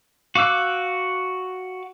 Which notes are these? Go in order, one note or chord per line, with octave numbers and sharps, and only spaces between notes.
F#4 F5 D6 E6 F#6